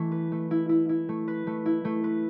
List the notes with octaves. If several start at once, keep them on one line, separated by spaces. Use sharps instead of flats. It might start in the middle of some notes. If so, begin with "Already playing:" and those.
Already playing: E3 A3
B4
A3
E4
E4
E4
A3
B4
A3
E4
A3
B4